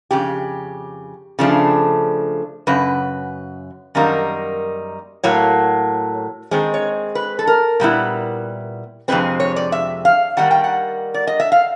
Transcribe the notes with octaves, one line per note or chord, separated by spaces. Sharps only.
F2 C#3 G4
C#3 F3 A3 D4
F#2 C#3 B4
F#2 D#3 G3 A#3 D#4
A2 F#3 A#3 C#5
D#3 G#3 C4 C5
C#5
B4
A4
A#4
A#2 G3 B3 E4
F2 C3 D#3 G#3 C4 B4
C#5
D5
E5
F5
D#3 G3 A#3 F#5
G5
F#5
D5
D#5
E5
F5